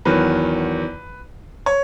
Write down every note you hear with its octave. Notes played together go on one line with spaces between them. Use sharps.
E2 D#3 F#3 B4
C#5